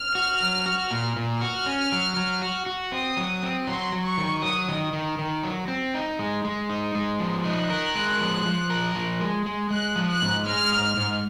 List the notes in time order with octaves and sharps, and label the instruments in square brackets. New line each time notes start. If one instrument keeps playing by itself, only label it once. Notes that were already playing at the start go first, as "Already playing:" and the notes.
Already playing: [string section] F6
[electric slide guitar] F#4
F#3
F#4
A#2
A#2
[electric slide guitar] F#4 [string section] F6
[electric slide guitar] C#4
F#3
F#3
F#4
F#4
[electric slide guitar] C4 [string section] D#6
[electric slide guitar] F#3
C4
[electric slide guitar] F#3 [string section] C6
[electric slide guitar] F#3
[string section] C#6
[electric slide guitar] D#3
[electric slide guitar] F#3 [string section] D#6
[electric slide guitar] D#3
D#3
D#3
F#3
C4
D#4
G#3
G#3
D#4
G#3
F3
[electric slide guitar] D#4 [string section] F#6
[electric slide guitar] A#4
G#3
F3
F3
A#4
F3
G#3
G#3
[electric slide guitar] G#3 [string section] F#6
[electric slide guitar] F3
[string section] F#6
[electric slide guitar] G#2
[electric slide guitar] G#3 [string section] F6
[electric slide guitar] G#2
G#2